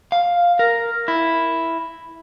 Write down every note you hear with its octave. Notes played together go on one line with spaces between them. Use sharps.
F5
A#4
E4